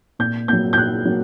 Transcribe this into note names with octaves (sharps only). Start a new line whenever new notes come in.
A#2 G6
F#3 A#3 G6
G6
A#2 F#6
F#3 A#3